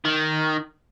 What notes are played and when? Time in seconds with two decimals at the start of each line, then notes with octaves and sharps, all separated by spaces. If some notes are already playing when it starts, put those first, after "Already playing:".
0.05 D#3